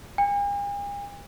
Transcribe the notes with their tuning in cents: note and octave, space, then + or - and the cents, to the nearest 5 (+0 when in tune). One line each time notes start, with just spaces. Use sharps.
G#5 -45